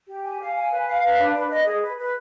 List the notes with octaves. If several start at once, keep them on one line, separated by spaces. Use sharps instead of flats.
G4
G#5
F5
G#5
B4
F5
B4
D4
B4
D#5
G#4
B4
B4